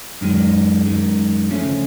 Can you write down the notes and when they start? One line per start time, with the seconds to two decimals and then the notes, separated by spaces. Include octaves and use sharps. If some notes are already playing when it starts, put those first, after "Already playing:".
0.21 F#2 D#3 G#3
0.86 F#2 D#3 G#3
1.50 D2 C#3 F3 A3 C#4